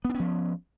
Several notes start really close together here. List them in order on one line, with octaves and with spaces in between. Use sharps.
B3 D4 C#4 F3